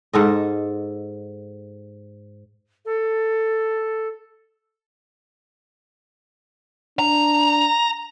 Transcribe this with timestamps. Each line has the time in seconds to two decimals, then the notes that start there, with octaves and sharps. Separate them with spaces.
0.13 G#2 A4 D#5
2.85 A4
6.99 D4 A#5